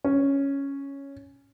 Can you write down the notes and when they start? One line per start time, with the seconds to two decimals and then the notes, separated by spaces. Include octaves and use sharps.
0.04 C#4